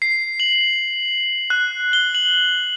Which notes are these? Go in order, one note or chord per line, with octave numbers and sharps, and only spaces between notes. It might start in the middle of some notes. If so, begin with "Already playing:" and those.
C7
F#7
F#6
G7
F#7